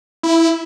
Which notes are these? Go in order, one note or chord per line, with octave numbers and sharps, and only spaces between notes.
E4